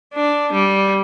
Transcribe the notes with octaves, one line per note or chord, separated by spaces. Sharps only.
D4
G3